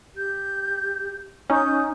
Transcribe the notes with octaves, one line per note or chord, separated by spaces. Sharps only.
G4 G6
C#4 D#4 G#5 D#6 G6